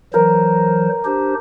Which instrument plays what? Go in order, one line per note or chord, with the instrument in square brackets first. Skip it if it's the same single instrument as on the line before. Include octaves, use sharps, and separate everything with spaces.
[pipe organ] E3 F#3 C5 [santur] A#4
[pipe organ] D4 G4 C5